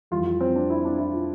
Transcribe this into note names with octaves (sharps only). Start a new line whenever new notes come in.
F2 E3 G3 F4
F4
C4
D4
E4
C4
D4
E4
F4